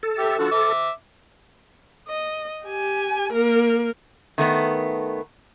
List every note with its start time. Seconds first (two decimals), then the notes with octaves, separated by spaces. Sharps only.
0.03 A4
0.18 G4 E5
0.39 D3 F3 F#4
0.51 E5 D6
2.08 D#5
2.65 G4 G#5
3.32 A#3 A#4
4.38 D#3 A3 B3